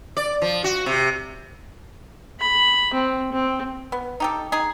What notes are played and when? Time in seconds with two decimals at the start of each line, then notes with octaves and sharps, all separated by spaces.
0.17 D5
0.42 F3
0.64 F#4
0.86 C3
2.40 B5
2.94 C4
3.32 C4
3.92 B3
4.20 D#4 G4 A4
4.52 D#4 G#4